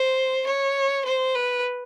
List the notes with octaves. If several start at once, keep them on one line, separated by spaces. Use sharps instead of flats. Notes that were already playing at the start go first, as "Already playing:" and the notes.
Already playing: C5
C#5
C5
B4